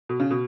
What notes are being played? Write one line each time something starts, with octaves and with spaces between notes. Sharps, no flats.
B2
C#3
B2